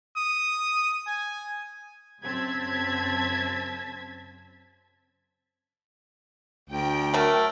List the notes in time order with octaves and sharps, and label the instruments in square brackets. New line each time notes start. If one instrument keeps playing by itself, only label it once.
[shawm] D#6
G#5
[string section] F#2 C#3 C4 A5 G#6 B6
[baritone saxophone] D2 [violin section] G5
[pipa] F#3 A3 [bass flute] A#4